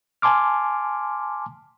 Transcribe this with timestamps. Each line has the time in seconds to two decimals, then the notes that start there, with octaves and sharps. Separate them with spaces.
0.22 G#5 A5 C6 D6 F6